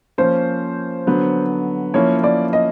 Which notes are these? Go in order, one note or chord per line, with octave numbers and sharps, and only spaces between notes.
F3 A#3 C#4 C5
D3 F#3 B3
F3 A#3 C#4 E4 C#5
D5
D#5